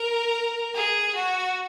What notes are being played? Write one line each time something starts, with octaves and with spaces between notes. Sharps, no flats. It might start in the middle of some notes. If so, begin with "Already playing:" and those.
Already playing: A#4
G#4
F#4